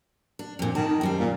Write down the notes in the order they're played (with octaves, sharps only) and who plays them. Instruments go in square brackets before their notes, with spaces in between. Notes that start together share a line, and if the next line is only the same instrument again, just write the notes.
[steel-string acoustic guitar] D4
F2 A#2
[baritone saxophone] D#3 [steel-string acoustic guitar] A5
[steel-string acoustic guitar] F#2 G3 C5
[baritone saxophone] A#2